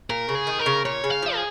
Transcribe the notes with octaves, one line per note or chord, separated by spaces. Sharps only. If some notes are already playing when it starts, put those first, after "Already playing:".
A#2 A#4
C#3
G#4
D#3
A#4
C#3
A#2 C#5
C#3
F5
F3
G#4